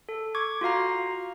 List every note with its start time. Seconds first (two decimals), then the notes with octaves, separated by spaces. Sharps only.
0.09 A4
0.35 C#6 D6 G#6
0.61 F4 F#4 F5 A#5